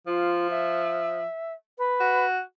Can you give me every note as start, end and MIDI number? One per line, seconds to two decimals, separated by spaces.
0.07 1.23 53
0.07 0.48 65
0.50 1.53 76
1.78 2.26 71
2.00 2.40 66